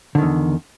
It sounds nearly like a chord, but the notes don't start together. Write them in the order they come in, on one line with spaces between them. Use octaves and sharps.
D3 D#3 E2